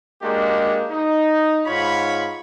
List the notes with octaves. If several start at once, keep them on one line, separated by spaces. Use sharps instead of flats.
G#3 A#3 D4 F#4 G4
D#4
G#2 F4 C#5 B5